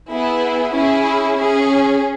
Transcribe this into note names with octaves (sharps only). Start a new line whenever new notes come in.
B3 E4 G#4
C#4 E4 G#4
C#4 G#4